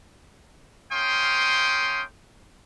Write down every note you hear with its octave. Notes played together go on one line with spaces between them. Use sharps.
A#3 C#4 F5 G5 C6 D#6